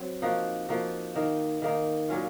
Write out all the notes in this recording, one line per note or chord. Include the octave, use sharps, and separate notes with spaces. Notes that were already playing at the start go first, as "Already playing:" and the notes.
Already playing: F#3 C4
F3 A#3 D#4 F#4
F3 A#3 D#4 F#4
D#3 A#3 D#4
D#3 A#3 D#4
A#2 F#3 C#4 F4